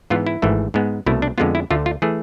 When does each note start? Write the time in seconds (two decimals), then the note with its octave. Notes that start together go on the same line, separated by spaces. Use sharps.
0.10 G#2 E3 B3 F4
0.27 E4
0.42 G#1 G#2 E3 A3
0.74 G#2 G#3 B3
1.06 C2 B2 A3 E4
1.22 D4
1.38 F2 D3 G#3 B3 F4
1.55 E4
1.71 D2 D3 A3 F4
1.86 F4
2.02 E3 A3 G#4